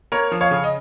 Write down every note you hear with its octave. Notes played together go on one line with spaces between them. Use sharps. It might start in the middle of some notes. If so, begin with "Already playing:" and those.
A#3 A#4 C#5
F3
C#5 F5
C#3
D#5